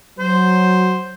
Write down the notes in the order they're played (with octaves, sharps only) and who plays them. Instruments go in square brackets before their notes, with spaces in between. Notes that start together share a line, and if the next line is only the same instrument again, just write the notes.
[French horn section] F#3 [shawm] C5